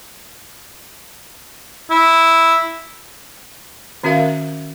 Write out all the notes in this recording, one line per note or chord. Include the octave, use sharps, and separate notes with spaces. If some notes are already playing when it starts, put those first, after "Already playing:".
E4
D#3 C#4 F#4 A#4 E5 F5